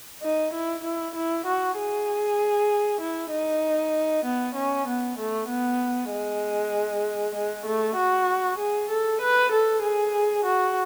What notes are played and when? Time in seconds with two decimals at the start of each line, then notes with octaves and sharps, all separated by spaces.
0.22 D#4
0.53 E4
0.84 E4
1.15 E4
1.46 F#4
1.77 G#4
3.00 E4
3.31 D#4
4.25 B3
4.55 C#4
4.87 B3
5.18 A3
5.48 B3
6.11 G#3
7.35 G#3
7.65 A3
7.96 F#4
8.58 G#4
8.89 A4
9.21 B4
9.52 A4
9.82 G#4
10.44 F#4